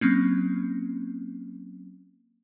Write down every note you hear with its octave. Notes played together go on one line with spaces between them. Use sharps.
F#3 A#3 C4 C#4